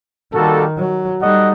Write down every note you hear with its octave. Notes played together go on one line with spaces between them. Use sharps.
D#3 G3 A#3 F#4 A4
F#3
G3 D#4 F#4 A4 D#5 F#5